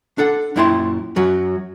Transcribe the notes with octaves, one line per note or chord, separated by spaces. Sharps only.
D4 A4 F#5
F#2 A#2 E4 G5 B5 C6
F#2 F#3